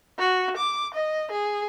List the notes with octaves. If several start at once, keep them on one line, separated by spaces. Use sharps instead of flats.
F#4
D6
D#5
G#4